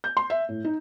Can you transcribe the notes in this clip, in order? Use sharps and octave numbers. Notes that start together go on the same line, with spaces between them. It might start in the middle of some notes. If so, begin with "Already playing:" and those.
G6
C6
E5
A2
D#4